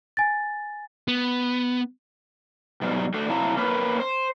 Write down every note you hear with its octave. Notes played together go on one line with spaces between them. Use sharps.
G#5 A6
B3
G#2 B2 F#3 G3
D3 A3 F#4
C3 F#3 E4 F5 A5 A#5
A#3 C#4 A#4 B4
C5